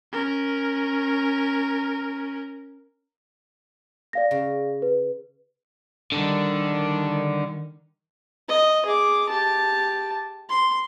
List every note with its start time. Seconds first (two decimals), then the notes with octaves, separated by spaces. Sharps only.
0.12 C#4 A#4
4.13 D5 F5 A#6
4.31 C#3
4.82 B4
6.12 D3 D#3 G3 D4
8.49 D#5
8.85 G#4 D6
9.29 G4 A5
10.49 C6